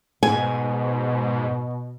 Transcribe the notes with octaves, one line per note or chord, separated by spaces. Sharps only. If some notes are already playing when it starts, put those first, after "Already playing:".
G#2 B2 G#5